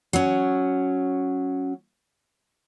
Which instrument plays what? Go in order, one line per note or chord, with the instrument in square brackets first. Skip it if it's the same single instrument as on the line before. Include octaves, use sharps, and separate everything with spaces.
[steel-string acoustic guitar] F#3 C#4